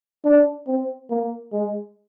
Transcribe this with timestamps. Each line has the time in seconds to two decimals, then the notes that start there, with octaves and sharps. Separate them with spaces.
0.25 D4
0.67 C4
1.10 A#3
1.52 G#3